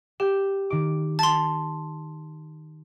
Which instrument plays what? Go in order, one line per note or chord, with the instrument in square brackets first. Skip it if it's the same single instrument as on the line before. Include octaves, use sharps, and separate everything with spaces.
[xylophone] G4 [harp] G5 G6
[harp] D#3 D6
[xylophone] A5 C6 [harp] A6